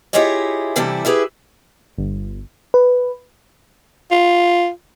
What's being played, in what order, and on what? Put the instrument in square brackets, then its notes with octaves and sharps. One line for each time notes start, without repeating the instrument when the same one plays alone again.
[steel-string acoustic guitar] E4 F4 G4 G#4 C#5 D#5
C3 E3 G3 D4 E4 A4
E4 G4 G#4 B4
[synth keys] G1
[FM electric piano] B4
[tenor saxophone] F4